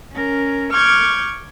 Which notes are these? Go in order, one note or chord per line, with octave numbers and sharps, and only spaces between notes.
C#4 A#4
C#6 D6 F6 G6 G#6